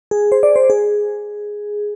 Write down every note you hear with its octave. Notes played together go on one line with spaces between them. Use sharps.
G#4
C5
D5
C5
G#4